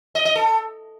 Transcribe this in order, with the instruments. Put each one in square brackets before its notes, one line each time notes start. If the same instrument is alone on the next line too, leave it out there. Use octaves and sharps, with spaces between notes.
[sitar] D#5
D#5
A4